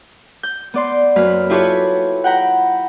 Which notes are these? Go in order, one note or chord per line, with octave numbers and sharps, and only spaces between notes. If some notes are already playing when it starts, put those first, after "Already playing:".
G6
B3 D5 C6
F#2 A#3 B4 B5 F6
E4 F4 G4 A4 B4 C#5
F#5 G5 A#5 B5